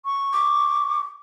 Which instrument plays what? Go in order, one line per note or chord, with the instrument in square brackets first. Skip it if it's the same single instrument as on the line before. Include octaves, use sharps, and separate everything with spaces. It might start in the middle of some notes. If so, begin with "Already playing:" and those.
[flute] C#6
[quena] D6